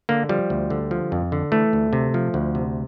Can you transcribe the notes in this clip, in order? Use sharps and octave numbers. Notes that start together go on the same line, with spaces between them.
D3 A#3
F3 G3
D2
D3
F3
F2
D3
E3 A3
D2
C3
F3
D2
C3